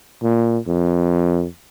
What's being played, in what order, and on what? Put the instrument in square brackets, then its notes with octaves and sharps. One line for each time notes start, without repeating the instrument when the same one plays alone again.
[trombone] A#2
F2